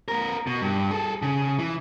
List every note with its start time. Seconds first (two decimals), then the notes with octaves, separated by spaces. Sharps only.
0.08 B3 A#4
0.47 B2
0.62 G2
0.91 G#4 A4
1.22 C#3
1.59 E3